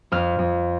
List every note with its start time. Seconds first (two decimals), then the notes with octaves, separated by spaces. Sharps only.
0.12 F2 F6
0.39 F2